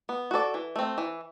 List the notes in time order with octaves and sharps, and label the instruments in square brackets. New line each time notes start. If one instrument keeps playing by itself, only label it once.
[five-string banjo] B3
F#4 A4 D5
E3
A3 C4
E3